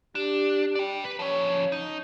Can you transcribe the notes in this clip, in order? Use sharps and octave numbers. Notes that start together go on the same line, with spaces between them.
D4 G4
D5 G5
B4
F3 C#4 C#5
D#4